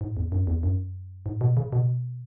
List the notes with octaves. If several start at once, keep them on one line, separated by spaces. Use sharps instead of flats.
G#2
E2
F#2
E2
F#2
G#2
B2
C#3
B2